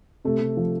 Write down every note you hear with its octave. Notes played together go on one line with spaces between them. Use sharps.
C3 A3
C3
F3